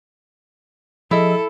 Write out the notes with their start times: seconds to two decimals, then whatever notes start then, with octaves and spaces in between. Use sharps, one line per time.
1.11 F3 E4 G#4 A4 D#5